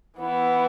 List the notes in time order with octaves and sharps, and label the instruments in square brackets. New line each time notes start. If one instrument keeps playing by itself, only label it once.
[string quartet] E3 B3 E4